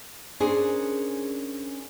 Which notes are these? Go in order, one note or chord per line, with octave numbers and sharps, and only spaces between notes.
C#4 D4 G#4 A#4 C5